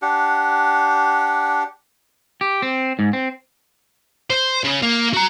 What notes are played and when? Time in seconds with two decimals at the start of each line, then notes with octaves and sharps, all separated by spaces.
0.02 D4 G4 F#5
2.41 G4
2.62 C4
2.99 G#2
3.13 C4
4.30 C5
4.64 C#3
4.82 A#3
5.14 F#4 A#5